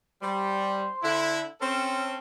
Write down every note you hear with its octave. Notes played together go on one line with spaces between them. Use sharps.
G3 C5
D3 E4
C4 C#4 A4 C5